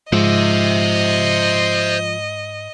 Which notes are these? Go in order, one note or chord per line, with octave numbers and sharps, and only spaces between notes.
G#2 F3 C5 D#5 E5